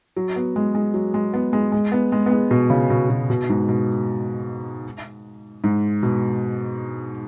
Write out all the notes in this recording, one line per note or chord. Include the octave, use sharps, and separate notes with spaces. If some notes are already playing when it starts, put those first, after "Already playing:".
F#3
B3
G#3
G#3
F#3
G#3
B3
G#3
G#3
B3
G#3
B3
G#3
B2
C#3
B2
B2
B2
G#2
B2
G#2
B2